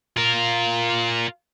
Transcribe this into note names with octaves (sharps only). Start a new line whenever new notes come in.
F4 A#4